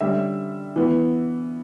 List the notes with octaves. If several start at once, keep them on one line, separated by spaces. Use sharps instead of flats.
D3 G3 C#4 E5
E3 B3